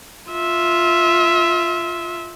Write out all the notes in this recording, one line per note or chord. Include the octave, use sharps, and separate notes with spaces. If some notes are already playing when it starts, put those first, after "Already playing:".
F4 E5